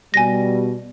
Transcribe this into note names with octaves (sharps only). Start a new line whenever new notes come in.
B2 G3 G#5 A#6